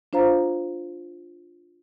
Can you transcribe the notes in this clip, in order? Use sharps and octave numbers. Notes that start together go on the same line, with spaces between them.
D4 F4 C5 F5 A#5